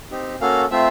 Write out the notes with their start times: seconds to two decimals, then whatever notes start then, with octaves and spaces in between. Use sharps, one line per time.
0.11 C4 D#4 G4
0.41 A#3 C#4 F#4 A4 F5
0.71 A3 C4 F4 E5